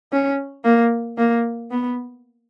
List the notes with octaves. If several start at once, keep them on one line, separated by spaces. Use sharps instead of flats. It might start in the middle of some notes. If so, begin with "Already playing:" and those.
C#4
A#3
A#3
B3